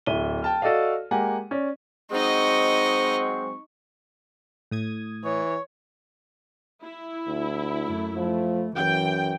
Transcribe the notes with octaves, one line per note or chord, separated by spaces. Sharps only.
D1 E4 E5 D#7 G7
G5 A5 F6
F#4 A4 D5 D#5 F5
G#3 A#3 G4 F#5 G#5
C#4 D5
F#3 G#3 C4 D#4 D#5 C#6
A2 D#6 G#6
E3 C#5 C#6
E4
D2
F#2 A3
F3 A3
F#2 E3 G5